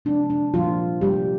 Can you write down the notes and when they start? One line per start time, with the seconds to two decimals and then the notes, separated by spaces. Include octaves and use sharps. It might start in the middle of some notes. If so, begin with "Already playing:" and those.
0.05 C3 F3 G#3 C4 D4
0.30 D4
0.54 A#2 F3 G3 A#3 F4
1.01 C3 F3 G3 A#3 G4